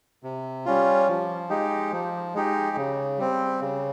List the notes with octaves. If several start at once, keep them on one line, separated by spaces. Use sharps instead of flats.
C3
G3 C#4 F4
F3
G#3 D#4 G4
F3
G#3 D#4 G4
C#3
G3 C4
C#3